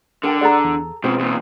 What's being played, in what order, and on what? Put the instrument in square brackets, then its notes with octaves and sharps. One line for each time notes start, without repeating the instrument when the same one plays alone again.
[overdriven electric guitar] D3 [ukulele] A#4 G5 A5
[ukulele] G#4 A4 A#5 [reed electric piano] D5 F#5
[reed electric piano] E2
[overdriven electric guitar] G#2 F3 [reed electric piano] B2 C4 [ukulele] B4
[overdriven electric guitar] E2 A#2